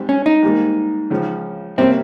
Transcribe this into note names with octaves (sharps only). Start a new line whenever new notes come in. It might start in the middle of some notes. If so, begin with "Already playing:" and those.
Already playing: G#2 G3 C4
C#4
D#4
G#2 G3 A#3
C#2 C#3 F3
C3 G3 A#3 C4 C#4